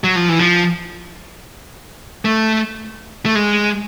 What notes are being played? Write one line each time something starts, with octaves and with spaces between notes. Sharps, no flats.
F#3
F3
E3
F3
A3
A3
G#3